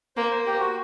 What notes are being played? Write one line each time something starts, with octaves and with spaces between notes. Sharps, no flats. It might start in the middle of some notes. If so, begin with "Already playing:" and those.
A#3 C5
C5
A#3 G4
F#4